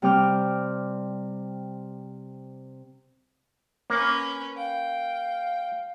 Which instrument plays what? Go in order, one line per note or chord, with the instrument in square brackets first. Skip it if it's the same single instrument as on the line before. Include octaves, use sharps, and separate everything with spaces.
[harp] C3 G3 C4 G5 D6 F6
[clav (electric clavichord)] A#3 [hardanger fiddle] C#4 B4
[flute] F5 [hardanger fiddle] G5